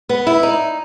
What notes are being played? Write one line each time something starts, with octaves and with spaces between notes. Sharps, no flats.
B3
E4
D#4